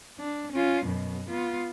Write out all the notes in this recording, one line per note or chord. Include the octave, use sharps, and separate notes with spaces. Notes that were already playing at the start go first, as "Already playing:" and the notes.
D4
C#4 F4
F#2 B2
B3 F4